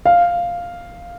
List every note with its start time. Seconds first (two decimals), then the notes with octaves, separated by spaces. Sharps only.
0.05 F5